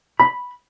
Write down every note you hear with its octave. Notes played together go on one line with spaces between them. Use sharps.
B5